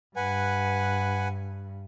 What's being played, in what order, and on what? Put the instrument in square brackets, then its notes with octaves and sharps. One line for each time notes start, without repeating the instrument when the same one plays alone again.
[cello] G2 [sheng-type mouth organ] B4 F#5 G#5